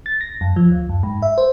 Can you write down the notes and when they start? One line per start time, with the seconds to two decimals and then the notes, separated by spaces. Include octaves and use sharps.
0.06 A6
0.21 A#6
0.41 F#2
0.56 F3
0.71 D2
0.89 F#2
1.03 G#2
1.22 E5
1.38 C5